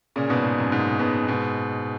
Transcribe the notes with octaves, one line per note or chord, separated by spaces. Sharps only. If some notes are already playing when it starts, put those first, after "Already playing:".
A#2 C#3
G#2 B2
G#2
F#2
G#2
G#2 B2
G#2 B2